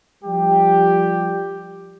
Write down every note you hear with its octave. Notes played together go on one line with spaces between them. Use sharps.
F3 G3 G4